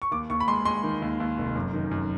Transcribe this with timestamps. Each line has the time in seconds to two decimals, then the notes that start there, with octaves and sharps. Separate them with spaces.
0.02 C#6
0.11 D#2 D6
0.30 D#2 C#6
0.40 B5
0.48 G#3 C6
0.65 G#3 C6
0.84 D#3
1.02 D#2
1.20 D#2
1.38 F1
1.56 F#2
1.73 D#3
1.91 F#2